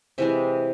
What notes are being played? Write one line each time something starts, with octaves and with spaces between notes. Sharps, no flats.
C3 E3 G#3 E5